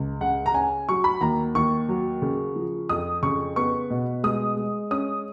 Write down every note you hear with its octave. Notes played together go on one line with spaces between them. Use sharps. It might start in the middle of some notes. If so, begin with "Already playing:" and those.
Already playing: C#2
C#3 F#5
A#5
C#4 G#5
F#3 C#6
B5
D#2 A#5
D#2 C#6
F#3
C#3
F3
F2 D#6
C#3 C#6
B3 C#6
B2
G#3 D#6
G#3
C#4 D#6